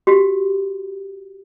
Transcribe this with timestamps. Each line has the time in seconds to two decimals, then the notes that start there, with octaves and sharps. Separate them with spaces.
0.07 F#4 G4